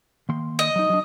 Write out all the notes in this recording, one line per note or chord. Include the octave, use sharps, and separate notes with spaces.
D#3 A#3 C6
D#5
F#3 D#4
F#3 D4